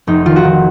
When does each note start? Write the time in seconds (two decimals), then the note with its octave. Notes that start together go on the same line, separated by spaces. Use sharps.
0.07 F1 D#4
0.26 D#3 F4
0.36 F#4
0.44 D#3